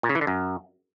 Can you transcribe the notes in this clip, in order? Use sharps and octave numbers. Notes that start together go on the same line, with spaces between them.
A#2
C#3
E3
D3
F#2